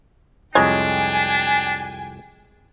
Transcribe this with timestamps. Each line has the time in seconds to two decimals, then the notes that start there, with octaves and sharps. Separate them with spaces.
0.55 C2 F2 G#3 D4 C#5 G5 G#5